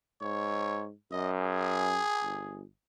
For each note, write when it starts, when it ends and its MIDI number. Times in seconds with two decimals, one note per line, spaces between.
0.21 0.91 44
0.21 0.85 73
1.12 2.00 42
1.12 1.31 75
1.41 2.62 68
2.22 2.63 31